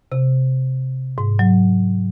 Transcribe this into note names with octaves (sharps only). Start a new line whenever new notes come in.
C3
G#2
F#3